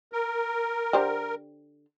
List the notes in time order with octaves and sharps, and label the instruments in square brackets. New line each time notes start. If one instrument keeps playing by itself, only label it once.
[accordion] A#4
[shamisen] D3 G4 C5